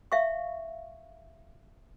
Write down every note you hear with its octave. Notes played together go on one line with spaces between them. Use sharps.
E5 F5 C#6